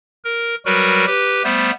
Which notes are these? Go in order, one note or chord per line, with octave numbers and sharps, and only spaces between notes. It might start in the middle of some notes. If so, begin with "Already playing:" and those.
A#4
F#3 G3 F#4 A#4 B4
G4 B4
G3 A3 B3 C5